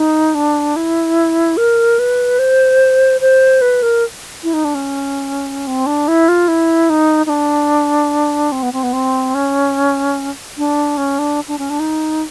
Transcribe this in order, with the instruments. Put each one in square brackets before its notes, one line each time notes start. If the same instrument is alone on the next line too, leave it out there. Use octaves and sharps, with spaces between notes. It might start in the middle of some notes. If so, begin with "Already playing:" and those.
Already playing: [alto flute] D#4
D4
E4
A#4
B4
C5
C5
B4
A#4
E4
D#4
D4
C#4
C4
D4
E4
F4
E4
D#4
D#4
D4
C4
B3
C4
B3
C4
C#4
D4
C#4
D4
D4
C#4
D4
D#4